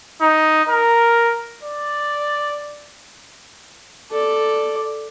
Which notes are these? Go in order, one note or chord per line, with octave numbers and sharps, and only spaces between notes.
D#4
A#4
D5
A4 D5